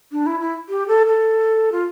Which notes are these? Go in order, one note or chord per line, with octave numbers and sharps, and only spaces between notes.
D4
E4
E4
G4
A4
A4
F4